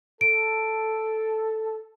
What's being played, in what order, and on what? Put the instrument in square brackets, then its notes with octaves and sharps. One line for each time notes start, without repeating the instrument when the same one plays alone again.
[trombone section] A4 [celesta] D7